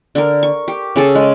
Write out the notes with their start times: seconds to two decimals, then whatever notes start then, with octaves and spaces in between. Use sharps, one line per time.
0.15 D3 A#4
0.43 C#6
0.68 G4
0.96 C#3 G#4 A4
1.15 G#3